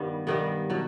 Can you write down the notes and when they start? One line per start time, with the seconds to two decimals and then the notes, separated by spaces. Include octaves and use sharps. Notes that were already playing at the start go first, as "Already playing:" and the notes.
Already playing: G2 D#3 G3 B3
0.27 G2 D#3 G3 B3
0.70 B2 F#3